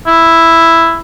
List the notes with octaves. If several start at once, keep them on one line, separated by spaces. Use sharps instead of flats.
E4